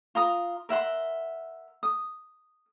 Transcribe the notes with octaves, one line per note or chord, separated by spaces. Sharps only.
F4 A#5 D#6
A#4 E5 F#5 C6
D#6